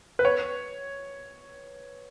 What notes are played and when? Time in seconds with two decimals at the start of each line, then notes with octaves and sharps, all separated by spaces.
0.19 B4
0.25 C#5